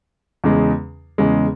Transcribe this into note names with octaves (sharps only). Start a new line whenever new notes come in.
E2 C#3 G#3
E2 C#3 G#3